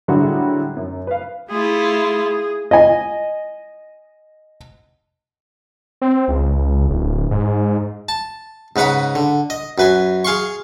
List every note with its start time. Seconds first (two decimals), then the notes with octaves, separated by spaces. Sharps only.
0.08 A2 D3 F#3 G3 F#4 G#4
0.77 F#2
1.07 B4 F5
1.50 A3 E4 F4 G#4
2.71 D#5 G#5
6.02 C4
6.28 C#2
6.89 D1
7.31 G#2
8.09 A5
8.76 G#2 C#3 B4 F#5 B5
9.15 D3
9.50 D#5
9.78 F#2 B4 G#5
10.25 G#4 F5 C6 C#6